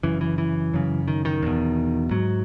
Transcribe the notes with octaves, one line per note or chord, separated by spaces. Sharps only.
F#2 C#3 E3
E3
E3
F#2 C#3
D#3
D#3
E2 B2
G#2 F#3